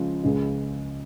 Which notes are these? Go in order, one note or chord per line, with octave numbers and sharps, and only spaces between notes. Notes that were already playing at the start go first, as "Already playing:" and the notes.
Already playing: C#3 F3 G#3
C#2 C#3 G#3